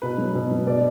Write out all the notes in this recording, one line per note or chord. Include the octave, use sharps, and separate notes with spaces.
B2 B4
F#3
B2
F#3
B2 D5